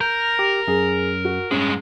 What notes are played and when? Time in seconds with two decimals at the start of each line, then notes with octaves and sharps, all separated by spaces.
0.01 A#4 G6
0.39 G4
0.68 F#2 G#4
1.25 F#4
1.51 G2 G#3 C#4